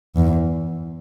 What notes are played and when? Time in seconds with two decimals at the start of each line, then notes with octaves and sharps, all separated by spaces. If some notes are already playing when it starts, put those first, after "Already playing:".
0.16 E2